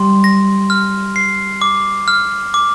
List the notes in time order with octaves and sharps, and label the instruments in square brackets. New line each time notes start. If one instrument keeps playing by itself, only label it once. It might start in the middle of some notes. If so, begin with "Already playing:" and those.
Already playing: [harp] G3 [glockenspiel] C6
[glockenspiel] A#6
F6
C7
D6
F6
D6